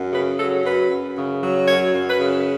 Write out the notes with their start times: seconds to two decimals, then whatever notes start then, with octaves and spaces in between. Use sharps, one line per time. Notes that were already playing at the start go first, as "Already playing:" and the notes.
Already playing: F#2
0.12 C#3 B4
0.38 F#3 A4
0.64 F#2 B4
0.90 F#2
1.17 C#3
1.42 F#3
1.68 F#2 C#5
1.94 F#2
2.08 B4
2.21 C#3